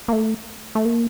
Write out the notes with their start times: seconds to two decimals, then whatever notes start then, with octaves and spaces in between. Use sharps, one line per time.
0.08 A#3
0.13 A3
0.75 A3
0.85 A#3